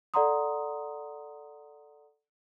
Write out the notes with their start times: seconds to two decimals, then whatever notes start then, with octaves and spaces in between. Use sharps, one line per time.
0.14 A4 D5 F#5 A#5 C6 D#6